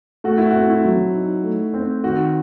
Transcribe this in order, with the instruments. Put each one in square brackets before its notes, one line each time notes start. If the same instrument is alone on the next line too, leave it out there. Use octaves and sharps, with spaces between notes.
[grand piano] A3 [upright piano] F#4
[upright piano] E4
F#4
[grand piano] C4
[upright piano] E4
[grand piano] F#3
D#4
A3
C4
[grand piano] D#3 [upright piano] F#4